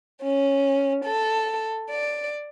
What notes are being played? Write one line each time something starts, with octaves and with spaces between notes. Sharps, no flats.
C#4
A4
D5